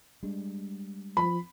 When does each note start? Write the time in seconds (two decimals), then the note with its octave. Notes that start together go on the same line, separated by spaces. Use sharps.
0.23 G3 G#3 D4
1.17 F3 B5